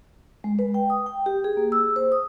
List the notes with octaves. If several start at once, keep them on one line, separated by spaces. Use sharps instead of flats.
G#3
B4
G5
D#6
G5
G4
G#4
A#3
E6
C5
D#6